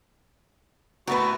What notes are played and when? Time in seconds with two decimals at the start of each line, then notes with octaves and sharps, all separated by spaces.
1.07 A2 A3 B3 F#4 A#4 B4